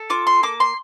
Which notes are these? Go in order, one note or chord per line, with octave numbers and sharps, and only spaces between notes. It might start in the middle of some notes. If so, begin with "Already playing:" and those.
Already playing: A4
F4 D6
C6
A#3 D6
C6